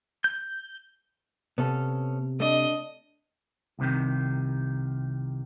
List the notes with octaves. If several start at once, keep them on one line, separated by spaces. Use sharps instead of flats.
G6
C3 B3 C#4 A4
A3 D4 D#5
C2 C3 D#3